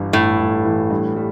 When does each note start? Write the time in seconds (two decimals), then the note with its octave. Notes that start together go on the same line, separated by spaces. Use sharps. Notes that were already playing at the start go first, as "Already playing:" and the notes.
Already playing: G1 G2 E3
0.13 G1 A2
0.39 G1
0.65 E3
0.91 G2
1.16 G3